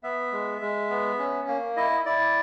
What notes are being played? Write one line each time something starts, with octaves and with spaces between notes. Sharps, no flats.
B3 E5
G#3
G#3
B3
C#4
A#3
E4 D#5
E4 D5